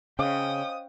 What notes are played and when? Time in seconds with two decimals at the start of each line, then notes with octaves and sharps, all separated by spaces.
0.19 C#3 C#4 C5 D#5 F5 G5 D#6